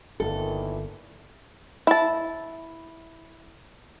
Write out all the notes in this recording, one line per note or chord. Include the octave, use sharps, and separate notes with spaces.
G1 A#2 D#3 E3 A4
E4 A5